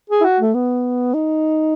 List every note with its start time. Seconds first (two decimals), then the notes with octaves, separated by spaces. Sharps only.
0.09 G#4
0.21 E4
0.24 F#4
0.40 A3
0.54 B3
1.14 D#4